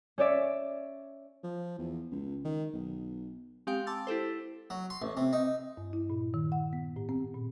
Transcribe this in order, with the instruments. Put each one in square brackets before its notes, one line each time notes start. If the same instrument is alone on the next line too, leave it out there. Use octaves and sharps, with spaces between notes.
[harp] C#4 C#5 D5 E5
[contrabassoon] F3
E2
C#2
D#3
B1
[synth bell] G#3 C4 G4 F5 G5
A5 C6 D6 E6 A6
E4 G4 A4 C5
[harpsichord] F#3
C6
A1
C3
D#4
[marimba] G2
E4
A#2
D#3
F#5
B3
A2
C4
A#2